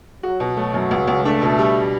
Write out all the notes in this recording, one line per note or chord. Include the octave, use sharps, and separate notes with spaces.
F#3 F#4
B2
F#3 A3
F#2
C#2
C#2
A3 D4
B2
G3